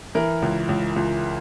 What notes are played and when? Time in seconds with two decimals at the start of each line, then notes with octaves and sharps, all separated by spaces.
0.15 E3 A#4
0.42 C#2
0.69 C#2
0.96 C#2